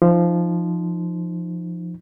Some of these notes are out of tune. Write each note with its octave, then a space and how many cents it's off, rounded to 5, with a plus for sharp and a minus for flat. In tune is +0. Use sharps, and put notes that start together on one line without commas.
F3 -10 D#4 -10